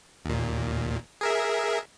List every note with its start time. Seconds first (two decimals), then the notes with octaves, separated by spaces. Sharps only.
0.25 D#2 A#2
1.21 G#4 A#4 E5